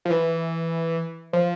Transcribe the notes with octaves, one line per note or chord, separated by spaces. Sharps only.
F3
E3
F3